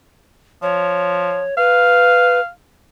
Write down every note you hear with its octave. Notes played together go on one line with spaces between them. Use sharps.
F3 C#5
B4 F5